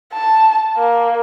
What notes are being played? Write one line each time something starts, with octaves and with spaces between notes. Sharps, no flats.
A5
A#3